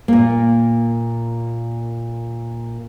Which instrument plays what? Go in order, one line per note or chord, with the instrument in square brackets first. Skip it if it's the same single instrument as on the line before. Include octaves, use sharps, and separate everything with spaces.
[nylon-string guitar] A#2 A#3